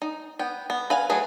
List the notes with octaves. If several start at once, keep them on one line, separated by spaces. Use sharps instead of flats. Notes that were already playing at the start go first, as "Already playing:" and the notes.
D#4
B3 G5
B3
B4 F5 F#5 G#5
F#3 A3 G#4 B4